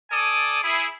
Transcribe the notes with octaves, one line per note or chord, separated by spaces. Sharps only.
A4 D5 G#5 D#6
E4 G#4